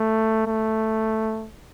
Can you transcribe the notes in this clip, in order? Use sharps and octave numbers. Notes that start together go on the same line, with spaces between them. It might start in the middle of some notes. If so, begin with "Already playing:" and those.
Already playing: A3
A3